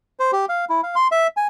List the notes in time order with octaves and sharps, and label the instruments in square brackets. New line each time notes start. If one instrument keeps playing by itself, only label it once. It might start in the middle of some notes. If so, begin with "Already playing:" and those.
[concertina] C5
G4
F5
E4
F5
C6
E5
G#5